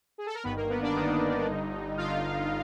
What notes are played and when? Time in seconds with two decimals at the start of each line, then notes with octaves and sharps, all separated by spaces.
0.18 G#4
0.26 A4
0.35 A#4
0.44 G1 G2 D#3 B3 B4
0.57 A#3 A#4
0.70 B3 B4
0.82 D4 D5
0.95 G1 G2 D#3 D#4 D#5
1.47 G1 G2 D3
1.97 G1 G2 D3 F4 F5